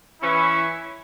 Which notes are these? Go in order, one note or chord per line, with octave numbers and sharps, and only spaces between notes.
E3 C#4 E4